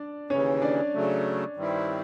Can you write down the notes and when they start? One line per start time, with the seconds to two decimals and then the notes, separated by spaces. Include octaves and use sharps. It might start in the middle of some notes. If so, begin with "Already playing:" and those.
Already playing: D4 D5
0.30 D#2 C#3 E3 C#4 C#5
0.61 D4 D5
0.94 C#3 F#3 A3
1.56 G2 D#3 G3 C4 E4